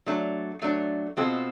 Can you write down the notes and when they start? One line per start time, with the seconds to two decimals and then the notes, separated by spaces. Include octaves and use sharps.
0.06 F#3 A3 D4
0.62 F#3 A3 D4
1.17 B2 G#3 C4 F4 A4